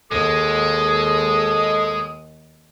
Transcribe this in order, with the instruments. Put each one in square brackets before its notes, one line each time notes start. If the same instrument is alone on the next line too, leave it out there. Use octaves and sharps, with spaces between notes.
[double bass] D#2 [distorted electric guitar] G#3 [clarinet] A4 [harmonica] D#6